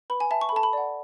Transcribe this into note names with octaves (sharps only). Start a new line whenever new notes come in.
B4 B5
G#5
E5 A5
C#6
B5
A4 A5
B5
D5 F#5